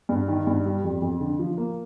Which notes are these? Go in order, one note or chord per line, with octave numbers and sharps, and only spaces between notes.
G2
D#3
G2
G3
F2
F2
D3
F3
A#3